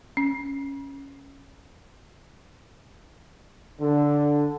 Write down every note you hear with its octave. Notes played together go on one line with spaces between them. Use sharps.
C#4
D3